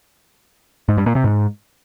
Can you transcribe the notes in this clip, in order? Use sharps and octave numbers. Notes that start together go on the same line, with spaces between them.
G#2
G2
A#2
C3
G#2